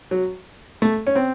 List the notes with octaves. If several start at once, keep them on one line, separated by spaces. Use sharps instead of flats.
F#3
A3
C#4
C4